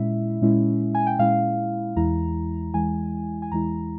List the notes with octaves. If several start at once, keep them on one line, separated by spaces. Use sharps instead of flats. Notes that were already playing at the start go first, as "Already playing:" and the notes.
Already playing: A#2 G#3 C#4 E4 E5
A#2 G#3 C#4 E4
G#5
G5
A#2 G#3 C#4 E4 F5
E2 E3 G#3 E4 A#5
E2 E3 G#3 E4 G#5
G#5
E2 E3 G#3 E4 A#5